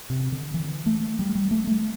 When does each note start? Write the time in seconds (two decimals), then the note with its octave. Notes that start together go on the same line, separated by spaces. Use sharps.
0.10 C3
0.32 D3
0.54 E3
0.86 A3
1.19 G3
1.35 G3
1.51 A3
1.67 A3